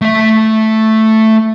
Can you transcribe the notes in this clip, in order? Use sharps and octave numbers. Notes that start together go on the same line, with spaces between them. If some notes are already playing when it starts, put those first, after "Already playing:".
A3 E5